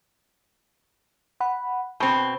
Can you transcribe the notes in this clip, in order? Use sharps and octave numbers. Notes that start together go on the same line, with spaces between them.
F#5 B5
B2 C4 A5